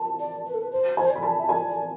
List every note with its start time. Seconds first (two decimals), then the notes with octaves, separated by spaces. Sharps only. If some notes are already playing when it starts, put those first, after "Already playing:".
Already playing: A5
0.19 D5
0.46 B4
0.54 A4
0.62 B4
0.72 C5
0.97 C5 G#5
1.10 D5
1.15 B5
1.23 A5
1.39 E5
1.49 D5 G#5
1.69 D5